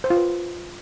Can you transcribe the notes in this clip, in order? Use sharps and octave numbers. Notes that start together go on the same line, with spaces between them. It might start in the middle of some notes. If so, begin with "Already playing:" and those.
C5
F4
B4